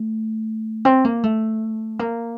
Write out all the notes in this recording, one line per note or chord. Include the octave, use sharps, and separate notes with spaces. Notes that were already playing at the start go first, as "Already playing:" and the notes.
Already playing: A3
C4
A#3
A3
A#3